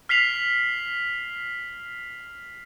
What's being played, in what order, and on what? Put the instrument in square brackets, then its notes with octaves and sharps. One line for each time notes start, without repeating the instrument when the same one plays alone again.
[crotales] F6 B6 C7 F7 F#7